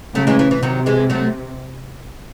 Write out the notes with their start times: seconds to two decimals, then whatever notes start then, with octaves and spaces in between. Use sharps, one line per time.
0.15 C#3 F#3 A3
0.27 E3 G#3
0.39 E3
0.51 E3
0.63 C3 D#3 F#3
0.86 E3 G#3
1.10 F#3 A3